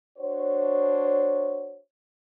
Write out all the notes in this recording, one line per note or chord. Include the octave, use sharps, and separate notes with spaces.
D4 F#4 C5 C#5